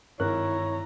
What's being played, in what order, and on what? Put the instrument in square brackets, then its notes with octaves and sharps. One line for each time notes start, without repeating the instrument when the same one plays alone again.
[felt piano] G#1 A#4 F#6 [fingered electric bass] G2 D#3 [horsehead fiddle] E4 A#5 [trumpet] C#5